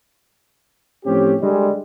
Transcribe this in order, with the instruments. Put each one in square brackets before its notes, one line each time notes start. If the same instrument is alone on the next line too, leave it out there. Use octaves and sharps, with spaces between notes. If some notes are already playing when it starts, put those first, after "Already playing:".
[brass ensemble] A2 F3 C4 C#4 G4
D3 G3 G#3